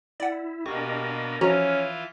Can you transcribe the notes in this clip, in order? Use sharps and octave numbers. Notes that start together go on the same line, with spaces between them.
E4 D5 F#5
B2 A#3 D4 G4 A#4 D#5 C#6
E3 F3 C#4 F4 F#4 A#5